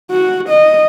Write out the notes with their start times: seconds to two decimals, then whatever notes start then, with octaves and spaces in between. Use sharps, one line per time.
0.11 F#4
0.49 D#5